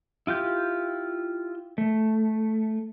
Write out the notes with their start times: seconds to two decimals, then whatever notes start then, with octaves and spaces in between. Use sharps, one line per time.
0.27 E4 F4 G4 G6
1.78 A3